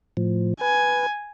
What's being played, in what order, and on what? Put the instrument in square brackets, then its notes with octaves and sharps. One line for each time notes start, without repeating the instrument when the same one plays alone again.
[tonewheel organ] A2 F3
[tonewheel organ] B4 [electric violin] G#5